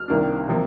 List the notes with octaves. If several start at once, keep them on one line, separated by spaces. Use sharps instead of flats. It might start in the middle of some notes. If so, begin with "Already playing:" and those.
Already playing: F6
C2 C3 D#3 A#3 D4
C3 F3 A#3